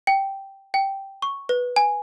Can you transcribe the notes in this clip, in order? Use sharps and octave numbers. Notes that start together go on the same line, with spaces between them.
G5
G5
C#6
B4
G#5